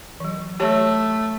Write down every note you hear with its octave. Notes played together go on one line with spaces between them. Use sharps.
E3 F#3
A3 G4 C#5 A5